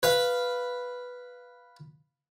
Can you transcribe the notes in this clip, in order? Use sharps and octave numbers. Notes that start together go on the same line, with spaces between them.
B4 F5